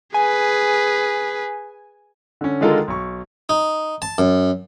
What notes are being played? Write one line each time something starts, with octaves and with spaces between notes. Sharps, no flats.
G#4 B4 G#5
D3 C#4
D3 D#3 G#3 F4 A4 A#4
B1 C#6
D#4
A5
F#2